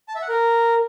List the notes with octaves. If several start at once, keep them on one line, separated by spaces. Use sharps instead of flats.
A5
E5
F#5
A#4